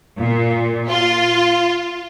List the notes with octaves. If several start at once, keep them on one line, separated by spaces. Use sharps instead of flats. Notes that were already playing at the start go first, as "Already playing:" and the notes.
A#2
F4